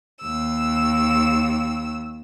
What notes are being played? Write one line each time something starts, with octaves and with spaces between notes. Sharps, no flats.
D#2 E6